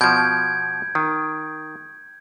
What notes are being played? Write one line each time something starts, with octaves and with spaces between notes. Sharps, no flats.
B2 F3 G6 G#6 D7
D#3